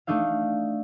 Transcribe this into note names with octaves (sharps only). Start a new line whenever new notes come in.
A3 D4 D#4 E5 F5